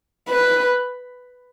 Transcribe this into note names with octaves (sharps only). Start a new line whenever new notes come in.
B4